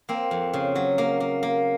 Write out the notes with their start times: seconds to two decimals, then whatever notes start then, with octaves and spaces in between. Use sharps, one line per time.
0.09 A#3 C4
0.31 F2
0.53 C#3
0.75 F#3
0.98 A#3
1.20 A#3
1.43 A#3